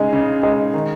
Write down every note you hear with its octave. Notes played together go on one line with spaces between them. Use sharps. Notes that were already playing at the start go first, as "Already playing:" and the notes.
Already playing: C#3 G#3 D#4 G#4
C#3
G#3 D#4 G#4
D#3